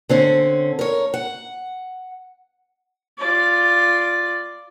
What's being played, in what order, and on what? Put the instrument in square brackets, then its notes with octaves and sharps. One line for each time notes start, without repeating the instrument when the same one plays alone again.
[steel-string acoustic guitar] D3 C4 C#4
A#4 C#5
F#5
[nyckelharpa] F4 D5